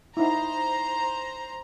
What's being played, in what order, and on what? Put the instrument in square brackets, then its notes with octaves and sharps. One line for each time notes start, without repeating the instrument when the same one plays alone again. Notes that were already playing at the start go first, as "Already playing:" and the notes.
[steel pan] D#4 E4 [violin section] C5 A#5